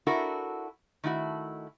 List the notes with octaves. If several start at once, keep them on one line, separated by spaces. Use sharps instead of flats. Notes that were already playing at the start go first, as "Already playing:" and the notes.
D4 E4 F#4 A4 A#4
D#3 A3 E4 F#4